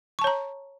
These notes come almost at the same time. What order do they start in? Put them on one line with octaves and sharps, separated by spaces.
C#6 A5 C#5 A#5